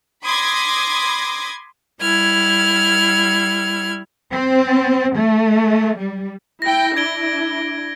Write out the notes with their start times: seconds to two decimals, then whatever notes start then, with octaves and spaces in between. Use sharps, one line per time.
0.23 B5 C6 D6 D#6 G#6 A#6
2.01 G3 E4 F6 G#6
4.32 C4
5.17 A3
5.97 G3
6.62 E4 G5 A#6
6.96 D4 E4 G#6 D7 G7